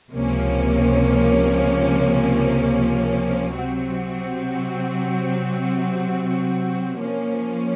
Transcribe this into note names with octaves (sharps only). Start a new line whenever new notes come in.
C#2 C3 F3 A#3 C#4
C3 F#3 C4 F#4
F3 A#3 C#4